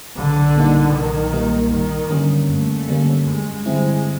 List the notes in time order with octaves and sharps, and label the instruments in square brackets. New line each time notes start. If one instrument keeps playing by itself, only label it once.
[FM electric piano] B1 [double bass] D3
[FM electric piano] A#2 G3 A#3 D#4
[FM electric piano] B1 [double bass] D#3
[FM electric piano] A#2 G3 A#3 D#4
[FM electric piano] G2 [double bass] D#3
[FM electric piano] D3 G3 A#3 C#4
[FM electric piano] G2 [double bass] A3
[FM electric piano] D3 G3 A#3 C#4
[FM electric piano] G2 [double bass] G#3
[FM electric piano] D3 G3 C4 E4 [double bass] G#3